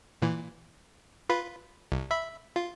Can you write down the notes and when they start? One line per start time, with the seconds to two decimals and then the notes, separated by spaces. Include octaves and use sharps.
0.22 A#2 E3
1.29 F4 B4 B5
1.92 C2
2.10 E5 B5
2.56 F4